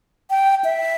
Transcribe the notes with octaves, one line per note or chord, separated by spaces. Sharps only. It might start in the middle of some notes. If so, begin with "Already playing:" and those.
G5
E5